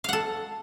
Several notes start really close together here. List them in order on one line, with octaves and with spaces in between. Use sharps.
F5 F#5 A4